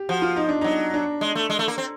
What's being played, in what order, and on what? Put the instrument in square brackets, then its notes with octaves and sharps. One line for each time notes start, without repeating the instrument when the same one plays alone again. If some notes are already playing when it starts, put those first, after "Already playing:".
Already playing: [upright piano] G4
[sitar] F3 [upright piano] F#4
[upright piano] F4
D#4
D4
[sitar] F#3 [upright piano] D#4
[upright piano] D4
[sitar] G#3
A3
G#3
A3
A#3
C4